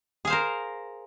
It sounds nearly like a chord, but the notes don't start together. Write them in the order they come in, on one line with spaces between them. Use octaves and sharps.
G#4 F5 C5 A#4